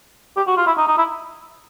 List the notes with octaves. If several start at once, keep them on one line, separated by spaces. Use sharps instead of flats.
G4
F#4
F4
E4
D#4
D#4
E4